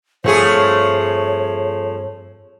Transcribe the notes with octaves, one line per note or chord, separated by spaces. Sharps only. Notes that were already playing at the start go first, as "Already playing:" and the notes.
G2 F3 A3 C4 G#4 C#5